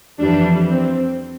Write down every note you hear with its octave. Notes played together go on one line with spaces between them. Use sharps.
F2 E3 G3 D4
C4